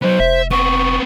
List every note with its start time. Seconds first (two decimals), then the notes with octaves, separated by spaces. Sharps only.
0.02 F#3 B3 C5
0.20 F1 E5
0.51 B3 C4 C#6